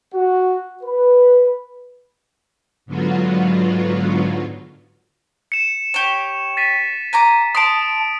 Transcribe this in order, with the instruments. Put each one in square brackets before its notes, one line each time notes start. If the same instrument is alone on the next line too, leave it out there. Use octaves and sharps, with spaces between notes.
[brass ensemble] F#4
B4
[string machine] G#2 D3 F#3 B3 F4 F#4
[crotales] C#7 E7
[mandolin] G4 C#5
[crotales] A6 B6 D#7
[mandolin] G#5 A#5 D6
[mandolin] A5 C6 [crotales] D#6 D7